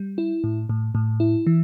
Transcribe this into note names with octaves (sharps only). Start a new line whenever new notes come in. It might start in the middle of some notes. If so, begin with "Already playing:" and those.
Already playing: G3
E4
A2
A2
A2
E4
E3